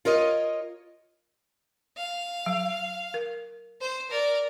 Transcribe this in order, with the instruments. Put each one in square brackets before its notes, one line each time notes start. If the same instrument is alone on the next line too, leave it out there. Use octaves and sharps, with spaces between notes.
[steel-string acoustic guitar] F4 A#4 C#5 D#5
[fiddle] F5
[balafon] F#3
A#4
[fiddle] C5
A#4 D5